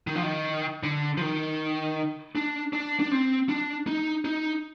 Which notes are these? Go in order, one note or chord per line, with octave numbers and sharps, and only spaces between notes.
D#3
F3
D#3
D3
F3
D#3
D4
D4
D4
C4
D4
D#4
D#4